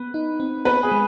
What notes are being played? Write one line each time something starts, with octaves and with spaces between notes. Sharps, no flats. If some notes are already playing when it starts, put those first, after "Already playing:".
Already playing: B3 B4
D#4
C4
B3 B4
G#4
G#3